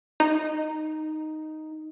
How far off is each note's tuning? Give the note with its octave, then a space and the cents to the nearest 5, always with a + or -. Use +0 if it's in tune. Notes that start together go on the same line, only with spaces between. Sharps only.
D#4 +0